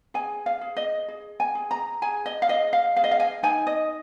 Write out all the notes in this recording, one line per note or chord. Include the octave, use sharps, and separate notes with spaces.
G#4 G#5
F5
G#4
D#5
G#4
G#5
G#4
A#5
G#4 G#5
D#5
F5
G#4 D#5
F5
G#4 F5
D#5
F5
G#5
D#4 G#5
D#5